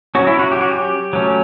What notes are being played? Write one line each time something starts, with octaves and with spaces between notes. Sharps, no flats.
F#3 C#4 F#4
E4
F#4
G4
F#4
G4
F#3 A3 C#4